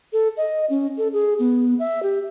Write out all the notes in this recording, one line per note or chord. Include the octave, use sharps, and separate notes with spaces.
A4
D#5
C#4
A4
G#4
B3
E5
G4